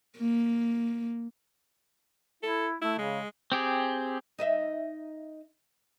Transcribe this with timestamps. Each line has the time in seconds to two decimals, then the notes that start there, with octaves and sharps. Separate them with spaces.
0.18 A#3
2.43 E4 A4
2.82 A3 E4
2.99 C#3 G#3
3.52 C4 G4 G#4
4.39 D#4 D#5 E5